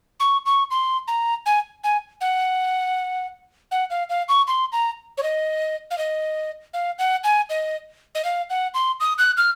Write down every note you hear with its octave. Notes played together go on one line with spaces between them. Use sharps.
C#6
C#6
C6
A#5
G#5
G#5
F#5
F#5
F5
F5
C#6
C6
A#5
C#5
D#5
F5
D#5
F5
F#5
G#5
D#5
D#5
F5
F#5
C6
D#6
F#6
F6